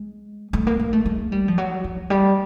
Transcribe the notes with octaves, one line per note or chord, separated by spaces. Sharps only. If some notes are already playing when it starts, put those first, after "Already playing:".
Already playing: G#3
A3
A#3
A#3
A3
G#3
G3
F3
F#3
F3
G3